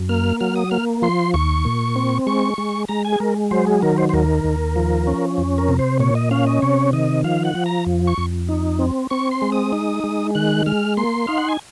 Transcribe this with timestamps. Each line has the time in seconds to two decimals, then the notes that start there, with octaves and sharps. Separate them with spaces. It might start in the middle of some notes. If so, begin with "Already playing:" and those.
Already playing: F#2
0.09 A#3 F6
0.40 F#3 F6
0.56 D#6
0.71 A#3 F6
1.02 F3 C6
1.34 D#2 C#6
1.65 A#2
1.96 C4
2.27 G#3 C#6
2.58 G#3
2.88 G#3 A#5
3.05 G#5
3.13 G#4
3.20 G#3 A#4
3.51 F#3 C5
3.67 G#4
3.82 D#3 A#4
3.98 C5
4.09 C5
4.13 D#2 A#4
4.44 D#2
4.76 F3
5.07 C#4
5.38 F2
5.58 A#4
5.69 C3
5.79 C5
6.00 A#2 C#5
6.15 D#5
6.31 C#4 F5
6.47 D#5
6.62 C3 C#5
6.93 D#3 D#5
7.24 F3 F5
7.45 F#5
7.55 F3
7.66 A#5
7.86 F2
8.07 C#6
8.18 F2
8.49 D#4
8.79 C4
9.10 C4 C#6
9.31 C6
9.42 G#3
9.52 D#6
9.73 D#4
10.04 G#3
10.35 D#3 F#6
10.66 G#3 F6
10.97 A#3 C6
11.27 D#4 F5
11.38 F#5
11.49 G#5